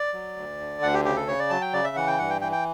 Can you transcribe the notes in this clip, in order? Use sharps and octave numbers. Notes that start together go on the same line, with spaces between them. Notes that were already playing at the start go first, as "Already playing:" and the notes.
Already playing: D5
F#3
D2
D3
D2 F#5
G4
C#3 G4
A4
C#3 C#5
D5
F#3 A5
G5
C#3 D5
E5
E3 F#5
G5
G2 F#5
G5
E3 G5
G5